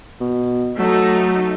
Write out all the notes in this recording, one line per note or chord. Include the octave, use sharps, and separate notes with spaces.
B2
F#3 A3 D#4